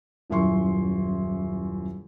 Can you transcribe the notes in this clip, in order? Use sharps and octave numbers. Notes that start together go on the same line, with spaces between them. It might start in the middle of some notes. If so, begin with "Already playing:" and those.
D#1 F#2 E4 C6 C#6